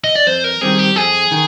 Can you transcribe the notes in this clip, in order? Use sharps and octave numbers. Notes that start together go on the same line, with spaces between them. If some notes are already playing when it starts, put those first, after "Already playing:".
D#5
D5
F2 C5
A#4
D#3 G3 C4 G#4
G4
F2 G#4
D#3